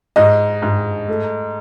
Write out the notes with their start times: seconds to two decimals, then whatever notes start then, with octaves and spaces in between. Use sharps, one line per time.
0.16 G#2 D#5
0.62 G#2
1.08 A3